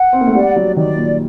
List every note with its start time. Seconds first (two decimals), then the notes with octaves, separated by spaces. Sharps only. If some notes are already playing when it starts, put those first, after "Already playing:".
Already playing: F#5
0.13 C4
0.21 A#3
0.27 A3
0.35 G3 D5
0.56 F#3
0.76 D#3 D5
0.97 A#2